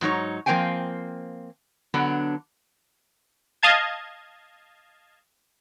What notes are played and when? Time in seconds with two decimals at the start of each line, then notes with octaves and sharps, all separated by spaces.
0.01 G#2 F#3 D#4 C#5
0.46 F3 A#3 C4 F5 G5 G#5
1.94 D3 F#3 B3 D4
3.63 D#5 F5 A5 G#6